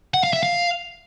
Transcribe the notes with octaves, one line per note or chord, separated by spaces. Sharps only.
F#5
F5
E5
F5